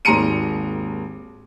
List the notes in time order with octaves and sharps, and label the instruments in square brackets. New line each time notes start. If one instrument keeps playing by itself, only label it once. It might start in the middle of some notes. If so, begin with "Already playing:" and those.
[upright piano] G#1 D#2 A#5 C6 C#7 D#7